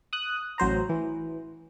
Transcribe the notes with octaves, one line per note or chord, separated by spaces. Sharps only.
D#6 F#6
A1 F#3 C5 A#5
E3